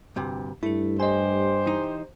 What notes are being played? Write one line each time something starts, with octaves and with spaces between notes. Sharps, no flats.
D2 G2 C3
G2 A3 E4 A4
G4 C5 D#5 G#5
E3 D#4